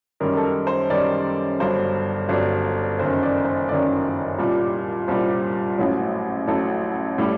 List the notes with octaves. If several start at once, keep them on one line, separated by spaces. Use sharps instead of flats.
F#2 D#3 G3 A#4
A4
A#4
C5
F#2 D#3 G3 D5
G1 G2 F#3 C5
G1 G2 F#3 D5
F#1 F#2 D#3 C5
D5
C5
F#1 F#2 D#3 D5
C2 A#2 G3
C2 A#2 G3 C5
A1 A2 F#3
A1 A2 F#3 A4
A2 G3